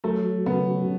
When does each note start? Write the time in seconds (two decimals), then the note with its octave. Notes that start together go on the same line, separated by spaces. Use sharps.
0.04 F#3 A3
0.46 C#3 B3